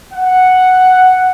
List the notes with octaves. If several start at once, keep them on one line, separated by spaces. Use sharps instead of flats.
F#5